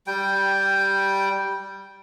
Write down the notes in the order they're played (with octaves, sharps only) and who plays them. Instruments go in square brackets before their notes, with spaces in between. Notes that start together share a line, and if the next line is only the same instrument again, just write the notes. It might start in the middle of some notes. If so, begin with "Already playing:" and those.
[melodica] G3 G5